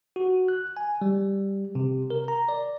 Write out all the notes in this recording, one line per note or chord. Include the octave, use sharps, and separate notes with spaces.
F#4
F#6
G#5
G3
C3
A#4
A#5
D5